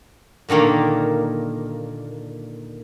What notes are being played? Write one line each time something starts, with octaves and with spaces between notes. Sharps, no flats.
A#2 D3 D#3 A#3